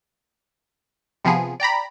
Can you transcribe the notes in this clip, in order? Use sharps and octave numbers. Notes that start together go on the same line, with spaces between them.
C3 F3 B3 G#4
D5 G5 A#5 B5